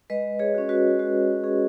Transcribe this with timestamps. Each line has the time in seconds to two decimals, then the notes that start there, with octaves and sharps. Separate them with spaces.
0.10 G#3 B4 D#5
0.39 G#4 C#5
0.54 C#4 F#4
0.69 F#4 B4
0.99 G#3 F#4
1.44 C#4 F#4 G#4